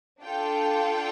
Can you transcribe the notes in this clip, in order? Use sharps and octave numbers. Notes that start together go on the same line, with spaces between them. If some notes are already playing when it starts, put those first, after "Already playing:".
D4 F4 A4 G5